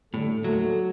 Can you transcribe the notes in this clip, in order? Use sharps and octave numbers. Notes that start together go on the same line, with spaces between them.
A2 D3 G3 D4 A4
D#2 D3 F#3 A3